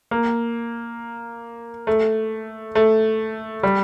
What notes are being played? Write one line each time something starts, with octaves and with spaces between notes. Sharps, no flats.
A#3
A3
A3
G3